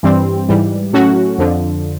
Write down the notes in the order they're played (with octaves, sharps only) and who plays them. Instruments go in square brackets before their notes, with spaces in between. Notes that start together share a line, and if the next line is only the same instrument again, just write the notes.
[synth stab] G2 E3 G3 C4
G#2 E3 G3
A2 F#3 A3 C#4 F#4
F2 D3 F3